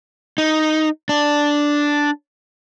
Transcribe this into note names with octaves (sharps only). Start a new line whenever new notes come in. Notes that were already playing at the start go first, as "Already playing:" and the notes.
D#4
D4